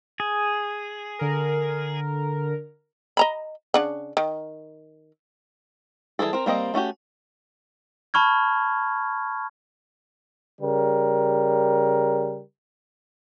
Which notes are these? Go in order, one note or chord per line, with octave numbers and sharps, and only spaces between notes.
G#4
D3 A#4
D#5 A#5 B5
C#3 D4 F#5
D#3
E3 F3 G3 G#4 A4
C4 A#4
G3 A#3 C4 D#5
A3 C#4 F#4 G4
A5 B5 C#6 F6 G#6
C#3 G3 A#4